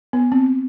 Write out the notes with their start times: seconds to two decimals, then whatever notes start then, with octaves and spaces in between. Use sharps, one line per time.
0.13 B3
0.32 C4